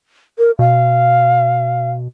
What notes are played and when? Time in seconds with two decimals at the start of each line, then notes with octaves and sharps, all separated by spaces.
0.38 A#4
0.59 B2 F5